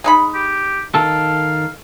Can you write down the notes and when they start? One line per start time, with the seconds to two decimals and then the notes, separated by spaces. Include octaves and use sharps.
0.04 G#3 D#4 B5
0.35 G4
0.95 D#3 A4 F5